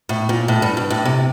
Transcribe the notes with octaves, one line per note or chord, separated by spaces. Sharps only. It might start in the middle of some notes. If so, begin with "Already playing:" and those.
A2
A#2
A2
G2
G2
A2
C3